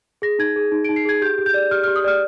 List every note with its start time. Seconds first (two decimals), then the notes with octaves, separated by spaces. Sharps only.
0.22 G#4 A#6
0.39 D#4 G#6
0.56 G#4
0.72 D#4
0.85 D#4 D7
0.96 C7
1.05 G#4 G#6
1.22 G4 G6
1.38 G4
1.46 G6
1.54 D5
1.71 G4 F6
1.84 G4 F6
1.96 D#6
2.04 D5 F6